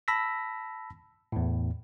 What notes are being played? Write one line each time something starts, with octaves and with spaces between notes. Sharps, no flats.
A5 B5 E6 A#6 B6
E2 A2